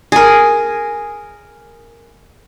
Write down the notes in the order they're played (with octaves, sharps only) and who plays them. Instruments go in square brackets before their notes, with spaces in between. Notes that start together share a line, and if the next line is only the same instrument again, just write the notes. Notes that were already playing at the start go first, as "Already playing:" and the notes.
[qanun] G#4 A#4